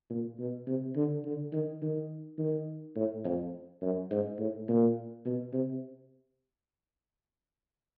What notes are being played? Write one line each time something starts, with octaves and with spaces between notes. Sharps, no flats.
A#2
B2
C3
D3
D3
D#3
D#3
D#3
A2
F2
F#2
G#2
A2
A#2
B2
C3